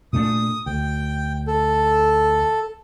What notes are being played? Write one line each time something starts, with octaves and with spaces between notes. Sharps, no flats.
A#2 A3 D4 D#6
D2 G5
A4